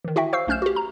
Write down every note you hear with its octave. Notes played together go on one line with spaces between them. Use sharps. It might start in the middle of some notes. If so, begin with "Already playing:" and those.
D#3 E3
E4 F#4 E5 G5
C5 F5 C#6 E6 C7
B1 A3 C#4 F6 G6 E7
F#4 G4
A#5